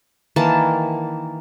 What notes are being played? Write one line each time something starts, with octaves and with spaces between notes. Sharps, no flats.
D#3 E3 A#3 A5